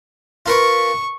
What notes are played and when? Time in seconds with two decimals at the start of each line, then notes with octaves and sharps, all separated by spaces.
0.46 F4 A#4 B4 C#6